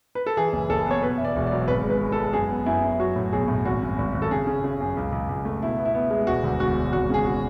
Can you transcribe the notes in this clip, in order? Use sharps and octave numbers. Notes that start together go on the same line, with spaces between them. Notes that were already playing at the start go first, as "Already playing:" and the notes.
B4
A4
E3 G#4
F#1
F#1 A4
B3 C#5
B2 B4
E2 E5
D5
E1
D5
F#3
G#1 B4
G#3
B4
G#3
A4
G#3
F#2 G#4
B3
F#2 E4
F#2
F#3 F#4
A2
B1 G#4
A2
G#1 F#4
F#2
G#1
G#1
A4
C#3 G#4
C#3
C#3
F#2
C#2
C#2
C#2
A3
B2 E4
B3
E4
B3
G#3
E1 F#4
D2
E1 F#4
E1
G#1 F#4
C#3 G#4
F#4